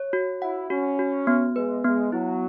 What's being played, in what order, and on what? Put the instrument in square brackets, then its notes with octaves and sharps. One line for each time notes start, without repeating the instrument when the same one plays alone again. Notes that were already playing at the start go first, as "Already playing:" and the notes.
Already playing: [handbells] C#5
F#4
[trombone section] E4 [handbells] F#5
[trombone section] C#4 [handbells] F#4
[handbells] F#4
B3
[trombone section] G#3 [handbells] B4
[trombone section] G#3 [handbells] B3
[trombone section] F#3 [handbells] E4